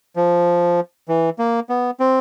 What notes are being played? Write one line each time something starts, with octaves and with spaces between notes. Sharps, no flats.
F3
E3
A#3
B3
C4